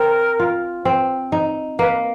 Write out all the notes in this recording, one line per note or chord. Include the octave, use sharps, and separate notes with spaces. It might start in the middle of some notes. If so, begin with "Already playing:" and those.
Already playing: C4 A#4
F4
C4
D#4
A#3 B4